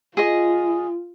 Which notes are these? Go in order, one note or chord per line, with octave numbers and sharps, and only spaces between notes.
F4 G#4 D#5